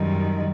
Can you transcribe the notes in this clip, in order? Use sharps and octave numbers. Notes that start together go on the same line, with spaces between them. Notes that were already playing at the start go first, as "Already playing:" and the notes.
Already playing: F#2 D#3 G3